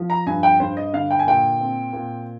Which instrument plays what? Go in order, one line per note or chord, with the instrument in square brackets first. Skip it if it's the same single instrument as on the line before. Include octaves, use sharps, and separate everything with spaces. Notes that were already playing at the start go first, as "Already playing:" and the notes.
Already playing: [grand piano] F3
A#5
G2 G#5
G5
G2 C5
D#5
D3 F5
G5
G#5
A#2 G5
C4
A#2